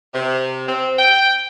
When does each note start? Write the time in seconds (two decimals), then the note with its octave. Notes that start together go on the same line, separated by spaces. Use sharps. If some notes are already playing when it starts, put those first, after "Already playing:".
0.14 C3
0.68 C4
0.99 G5